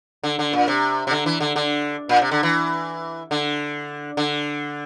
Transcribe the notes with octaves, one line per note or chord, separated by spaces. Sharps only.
D3
D3
A#2
C3
C3
D3
E3
D3
D3
A#2
C3
D3
E3
D3
D3